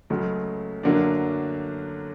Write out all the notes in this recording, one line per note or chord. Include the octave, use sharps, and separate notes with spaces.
C#2 C#3 F#3 A3
F#2 D3 F#3 A#3 D4